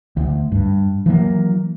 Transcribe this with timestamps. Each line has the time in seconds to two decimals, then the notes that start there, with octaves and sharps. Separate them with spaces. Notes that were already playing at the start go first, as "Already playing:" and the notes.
0.17 D2
0.52 G2
1.06 E3 F#3 A3 A#3